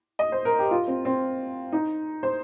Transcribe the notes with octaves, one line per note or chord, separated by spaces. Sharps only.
D#5
C5
A#4
G4
F4
C4
C4
D#4
C5